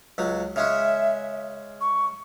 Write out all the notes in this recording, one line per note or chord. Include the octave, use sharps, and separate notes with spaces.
C#2 F#3
C#3 G#3 C#4 E5
C#6